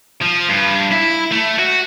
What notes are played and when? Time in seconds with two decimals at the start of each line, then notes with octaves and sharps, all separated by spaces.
0.22 F3
0.49 G2
0.92 E4
1.31 A3
1.59 F#4